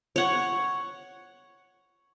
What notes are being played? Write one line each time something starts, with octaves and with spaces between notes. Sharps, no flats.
C#5 F#5